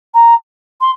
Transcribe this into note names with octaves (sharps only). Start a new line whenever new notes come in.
A#5
C6